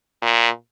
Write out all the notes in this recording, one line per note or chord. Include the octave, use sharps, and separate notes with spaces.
A#2